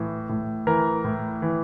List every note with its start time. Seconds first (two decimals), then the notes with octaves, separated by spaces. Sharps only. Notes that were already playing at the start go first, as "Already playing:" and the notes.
Already playing: A2 E3
0.29 A2
0.67 E3 A#4
1.04 A2
1.42 E3